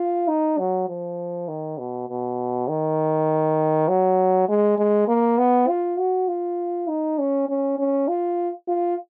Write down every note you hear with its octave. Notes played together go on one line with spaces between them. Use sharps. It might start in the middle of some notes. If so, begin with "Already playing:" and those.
Already playing: F4
D#4
F#3
F3
D#3
B2
B2
D#3
F#3
G#3
G#3
A#3
B3
F4
F#4
F4
D#4
C#4
C#4
C#4
F4
F4